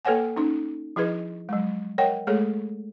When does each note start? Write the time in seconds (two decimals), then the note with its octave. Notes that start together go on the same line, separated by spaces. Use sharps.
0.05 A#3 A4 B4 C#5 F#5 G#5
0.36 C#4 D#4
0.96 F3 E4 G#4 B4 D#5
1.49 F#3 G#3
1.98 A#4 C#5 D#5 F#5 G5
2.27 G#3 A3 G#4 A4 C#5